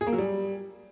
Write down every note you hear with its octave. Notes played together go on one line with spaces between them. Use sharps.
G#4
A#3
F#3
G3